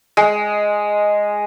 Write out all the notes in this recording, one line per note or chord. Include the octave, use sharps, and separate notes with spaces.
G#3